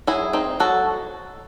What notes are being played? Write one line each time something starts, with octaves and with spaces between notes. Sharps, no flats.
F#3 E4 G#4
C4 D#4
F#3 F#4 A4